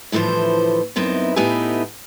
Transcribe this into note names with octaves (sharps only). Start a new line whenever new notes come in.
D2 A2 E3 F3 C5
F#2 B3 C4 D#4 E4
A2 B3 D#4 G4 E5 G#5